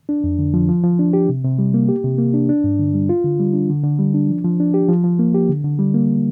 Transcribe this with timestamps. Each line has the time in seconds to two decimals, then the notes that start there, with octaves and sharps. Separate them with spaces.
0.09 D4
0.24 F2
0.39 D3
0.54 F3
0.69 F3
0.84 F3
0.99 D4
1.13 G4
1.29 C3
1.44 C3
1.59 G3
1.74 A#3
1.89 G4
2.04 C3
2.18 A#3
2.34 D4
2.49 D4
2.64 G2
2.79 D3
2.94 G3
3.09 F4
3.24 D3
3.40 G3
3.54 D4
3.70 D3
3.84 D3
3.99 G3
4.14 D4
4.29 F3
4.44 F3
4.60 D4
4.74 G4
4.89 F3
5.04 F3
5.19 A#3
5.34 G4
5.49 D3
5.64 D3
5.79 G3
5.94 A#3